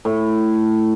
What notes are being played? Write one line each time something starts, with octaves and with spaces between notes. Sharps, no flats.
A2